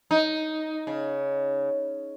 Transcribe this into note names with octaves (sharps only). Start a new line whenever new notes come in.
D#4
C#3